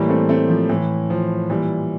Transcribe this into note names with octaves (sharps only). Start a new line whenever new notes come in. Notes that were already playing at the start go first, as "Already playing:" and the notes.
Already playing: A2 E3 G3 A#3
A3 C4
A3 C4
F3
A2 E3
F3
A#2 E3 G3